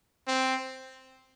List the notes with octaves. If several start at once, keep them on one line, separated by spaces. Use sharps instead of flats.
C4